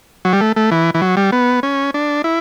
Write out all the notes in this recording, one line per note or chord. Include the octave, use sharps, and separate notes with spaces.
F#3
G3
A3
A3
E3
E3
F#3
G3
B3
C#4
D4
E4